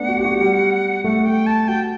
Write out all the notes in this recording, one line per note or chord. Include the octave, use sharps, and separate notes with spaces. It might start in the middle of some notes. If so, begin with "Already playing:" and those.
Already playing: A3 B3 D4 F#5
F#4
G4
F#4
G3
A3 F#5
G5
A5
F#4 G5